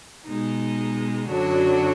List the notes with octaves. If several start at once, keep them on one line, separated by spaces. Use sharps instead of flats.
B2 G#3 D#4
F#2 D3 F#3 D4 F#4